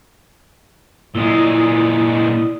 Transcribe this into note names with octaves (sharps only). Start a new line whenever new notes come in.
A#2 G#3 E4 D5 D#6